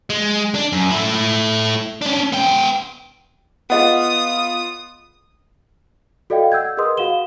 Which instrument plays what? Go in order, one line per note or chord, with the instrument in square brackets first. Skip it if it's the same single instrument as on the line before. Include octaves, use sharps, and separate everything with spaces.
[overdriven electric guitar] G#3
D4
F#2
A3 E4
C#4 D4
B3 G5
[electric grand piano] B3 F4 [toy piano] G#4 D#5 F#5 [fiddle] D#6
[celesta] F#4 A4 D5 D#5 F5 G5
F#5 E6 G6 G#6
G#4 A#4 B4 D#5 C6 D#6
F#4 F5 F#5 E7 G7